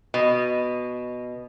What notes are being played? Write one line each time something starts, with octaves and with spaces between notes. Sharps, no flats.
B2